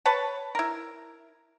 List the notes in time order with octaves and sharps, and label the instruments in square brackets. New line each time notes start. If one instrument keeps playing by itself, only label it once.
[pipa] B4 C#5 A5
E4 A#4